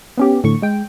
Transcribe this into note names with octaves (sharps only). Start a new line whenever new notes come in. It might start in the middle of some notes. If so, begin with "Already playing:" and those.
B3 C#4 G4
A2 D3 C#6
G#3 G5